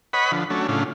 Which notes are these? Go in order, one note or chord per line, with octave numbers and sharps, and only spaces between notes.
B4 C#5 D#5 F#5 B5
D3 F3
F#3 A3 C#4 D4
A2 C#3 D4 F4